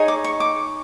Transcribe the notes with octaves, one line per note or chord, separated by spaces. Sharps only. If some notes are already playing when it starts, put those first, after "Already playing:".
Already playing: D#4 G#4 C#5
D6
C#6
D6